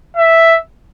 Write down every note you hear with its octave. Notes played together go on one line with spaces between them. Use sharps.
E5